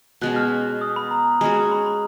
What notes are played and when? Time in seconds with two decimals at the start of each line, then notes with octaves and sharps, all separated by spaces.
0.21 B2 G#3 C#4 F#6
0.36 F6
0.81 D#6
0.96 B5
1.11 A#5
1.41 G#3 C#4 F#4
1.71 B5
1.86 B5